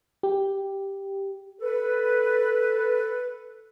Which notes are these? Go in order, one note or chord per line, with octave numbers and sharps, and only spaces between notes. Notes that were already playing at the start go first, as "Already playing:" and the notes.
G4
A4 B4